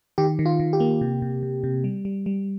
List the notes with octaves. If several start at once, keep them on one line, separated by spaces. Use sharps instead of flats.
D#3 G4
D#3
F4
D#3
G4
A#3
C3
C3
C3
C3
G3
G3
G3